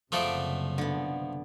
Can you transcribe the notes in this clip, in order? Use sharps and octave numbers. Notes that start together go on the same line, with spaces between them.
F#1 C3 F3 A3 G#4 B4 D5 F#5
D3 B3